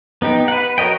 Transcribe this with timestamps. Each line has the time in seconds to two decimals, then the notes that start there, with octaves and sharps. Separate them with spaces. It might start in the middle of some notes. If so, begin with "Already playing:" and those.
0.22 B3 D#4 G4
0.48 B4 F#5
0.78 F#4 A#4 C#5 D#5 G5